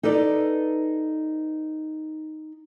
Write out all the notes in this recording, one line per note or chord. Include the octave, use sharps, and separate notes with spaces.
D#4 A4 B4 D5